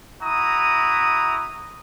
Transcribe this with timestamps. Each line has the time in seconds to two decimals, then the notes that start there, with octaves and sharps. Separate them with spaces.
0.22 E4 F#4 A#5 D#6